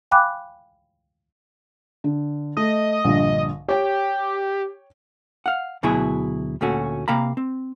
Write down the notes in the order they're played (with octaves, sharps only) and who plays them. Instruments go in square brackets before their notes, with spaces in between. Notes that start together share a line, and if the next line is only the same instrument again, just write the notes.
[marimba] F5 G5 G#5 B5 D6 F#6
[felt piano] D3
[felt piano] A3 [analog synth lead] D#5
[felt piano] A#1 G2 D3
[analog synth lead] G4 [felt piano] C#5 G5
[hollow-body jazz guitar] F5 F#5
D2 B2 F#3 E4 G#4
D2 A#2 A3 C#4 F#4
C3 A#3 F5 A#5 B5
C4